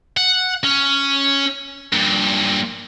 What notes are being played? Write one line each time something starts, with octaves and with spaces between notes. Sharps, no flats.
F#5
C#4
G2 A#2